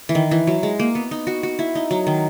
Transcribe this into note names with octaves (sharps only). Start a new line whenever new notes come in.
E3
D#3
E3
F#3
G#3
A#3
B3
D#4
F#4
F#4
E4
D#4
F#3
D#3